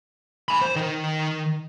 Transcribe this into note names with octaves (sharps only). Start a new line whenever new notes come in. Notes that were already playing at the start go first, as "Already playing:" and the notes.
G#5 B5
C5
D#3 A#4